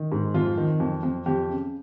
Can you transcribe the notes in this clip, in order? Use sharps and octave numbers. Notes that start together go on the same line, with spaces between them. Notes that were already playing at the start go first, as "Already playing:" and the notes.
Already playing: D#3
G#2
F2 F4
D#3
F2
F2
F2 G4
C#3